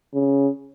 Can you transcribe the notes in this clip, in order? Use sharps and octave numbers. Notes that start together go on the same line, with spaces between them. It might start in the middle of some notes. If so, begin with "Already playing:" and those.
C#3